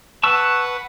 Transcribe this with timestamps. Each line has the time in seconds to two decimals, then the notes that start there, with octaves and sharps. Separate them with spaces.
0.23 B4 F#5 A5 C#6 E6